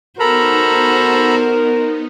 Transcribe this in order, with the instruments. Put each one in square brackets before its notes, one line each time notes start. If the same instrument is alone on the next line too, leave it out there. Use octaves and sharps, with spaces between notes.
[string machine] B3 D#4 [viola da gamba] F#4 C5 [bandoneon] A4 A#5 B5 [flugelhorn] A#4